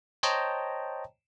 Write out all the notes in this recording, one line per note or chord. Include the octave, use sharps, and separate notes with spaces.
C5 C#5 D#5 G5 A5 A#5